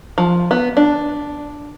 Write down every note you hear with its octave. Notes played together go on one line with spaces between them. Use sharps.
F3
B3
D4